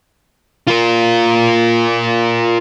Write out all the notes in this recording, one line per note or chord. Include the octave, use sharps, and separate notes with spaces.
F4 A#4